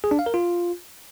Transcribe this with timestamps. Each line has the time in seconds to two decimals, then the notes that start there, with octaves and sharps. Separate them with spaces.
0.04 G#4
0.11 D4
0.19 F5
0.26 A#4
0.34 F4